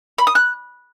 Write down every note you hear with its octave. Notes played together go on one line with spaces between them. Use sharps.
B5
D#6
F#6